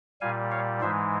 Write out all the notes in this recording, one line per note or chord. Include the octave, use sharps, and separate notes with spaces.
A#2 G3 F5 G#5
C#5 F5
G#2 E3 G#3 C5 E5